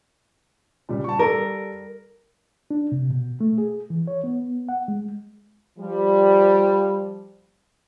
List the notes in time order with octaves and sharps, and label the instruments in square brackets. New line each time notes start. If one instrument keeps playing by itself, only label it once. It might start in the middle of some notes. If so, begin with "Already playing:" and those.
[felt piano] A#2 C#3 G3
A5 C#6
[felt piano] G3 A4 [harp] A#4
[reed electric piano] D4
C3
B2
A3
G#4
E3
C#5
B3
F#5
G#3
[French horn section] F3 G3